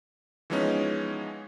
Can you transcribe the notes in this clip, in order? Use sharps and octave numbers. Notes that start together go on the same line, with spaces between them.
E3 F3 G#3 B3 C#4 D#4